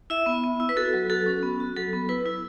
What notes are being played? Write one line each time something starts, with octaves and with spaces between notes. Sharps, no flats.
E4 E5
B3
B3
E4
B4
F#4 A4
F#3
F#4 A4
C#4
B3
F#4
F#3 A4
B3
E4 B4
E4